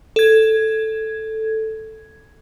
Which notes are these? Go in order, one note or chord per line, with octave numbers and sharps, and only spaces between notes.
A4 G#6